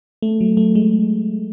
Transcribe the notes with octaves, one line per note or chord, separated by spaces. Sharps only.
A3
F#3
A3
G#3